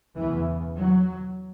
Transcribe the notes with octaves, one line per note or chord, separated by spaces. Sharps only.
E2 C#3 E3
F#3